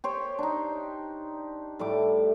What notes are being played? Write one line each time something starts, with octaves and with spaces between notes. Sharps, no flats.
G4 C5 C#5
D4 D#4
A2 G3 A3 D6